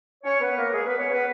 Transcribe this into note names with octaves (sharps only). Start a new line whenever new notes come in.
C#4 C#5
B3 B4
A#3 A#4
G#3 G#4
B3 B4
C#4 C#5
B3 B4